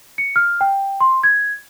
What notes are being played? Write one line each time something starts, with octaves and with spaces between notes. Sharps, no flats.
C#7
F6
G5
C6
G#6